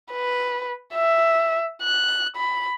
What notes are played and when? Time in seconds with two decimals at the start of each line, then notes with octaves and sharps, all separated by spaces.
0.12 B4
0.94 E5
1.82 F#6
2.37 B5